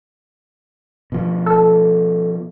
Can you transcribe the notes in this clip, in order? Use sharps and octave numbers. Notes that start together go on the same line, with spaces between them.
B2 F3
A4